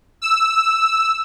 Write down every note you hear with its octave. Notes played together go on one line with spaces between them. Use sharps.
E6